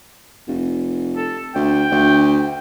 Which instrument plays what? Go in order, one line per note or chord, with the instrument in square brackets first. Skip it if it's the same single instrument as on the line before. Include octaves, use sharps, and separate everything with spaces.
[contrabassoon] F1
[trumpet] A4
[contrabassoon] D2 [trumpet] G5
[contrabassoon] D2